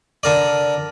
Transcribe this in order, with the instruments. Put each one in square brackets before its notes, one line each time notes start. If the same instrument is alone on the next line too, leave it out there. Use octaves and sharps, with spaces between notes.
[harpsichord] D3 A#4 D5